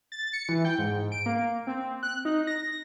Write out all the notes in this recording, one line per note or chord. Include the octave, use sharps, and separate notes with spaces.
A6
C#7
E3
G5
G#2
D7
A#3
C4
F#6
D#4
A#6